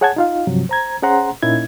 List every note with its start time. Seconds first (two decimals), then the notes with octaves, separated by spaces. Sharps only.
0.01 G#4 C#5 F#5 G#5 A5 G#6
0.16 D#4 F4 F5
0.47 G2 C3 F3 F#3
0.69 C5 A#5 G#6
1.02 C#4 G#4 C5 F#5 A#5 C6
1.42 A#2 A#3 C#4 D#4 E4 G#6